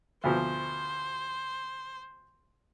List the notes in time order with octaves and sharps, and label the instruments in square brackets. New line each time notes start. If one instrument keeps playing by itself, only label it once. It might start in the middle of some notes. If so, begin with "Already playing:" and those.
[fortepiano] D2 B2 F3 [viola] C5